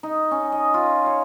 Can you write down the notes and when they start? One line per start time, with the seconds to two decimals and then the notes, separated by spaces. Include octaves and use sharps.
0.03 D#4
0.31 C#4
0.52 D#5
0.74 F4
1.06 C#5